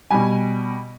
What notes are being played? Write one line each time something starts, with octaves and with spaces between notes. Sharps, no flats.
B2 G3 G#5